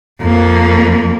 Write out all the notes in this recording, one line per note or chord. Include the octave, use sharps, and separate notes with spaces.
F2 A#3